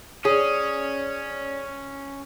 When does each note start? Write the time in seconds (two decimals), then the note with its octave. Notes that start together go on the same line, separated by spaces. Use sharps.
0.25 C#4 G#4 C#5 D5